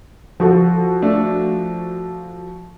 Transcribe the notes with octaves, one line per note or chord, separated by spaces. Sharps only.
F3 F#4 A4
A3 D4